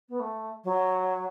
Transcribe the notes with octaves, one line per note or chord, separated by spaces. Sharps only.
B3
A3
F#3